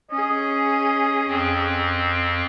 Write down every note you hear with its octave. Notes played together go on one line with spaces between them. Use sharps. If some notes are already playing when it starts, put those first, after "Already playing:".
C#4 G#4 D#5
F2 C4